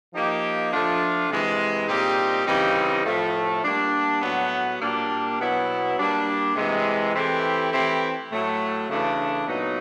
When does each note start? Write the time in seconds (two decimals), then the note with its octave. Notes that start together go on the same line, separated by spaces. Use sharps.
0.13 F3 A#3 D#4 G4
0.72 F3 A3 D4 F4
1.30 C3 E3 G#3
1.88 A#2 G3 C4 D#4 G4
2.47 C#3 E3 G3 C4 D#4
3.05 A2 F3 A3
3.64 G3 A#3 D4
4.22 A2 F#3 B3
4.81 A#2 G3 A#3 D4
5.39 B2 F#3 B3 E4
5.98 G3 A#3 D4
6.55 C3 E3 G#3
7.14 E3 A3 C4 E4 G4
7.73 E3 A3 C4 E4 G4
8.31 A2 F#3 A3
8.89 C#3 E3 A3 D4
9.47 A#2 F#3 B3 D#4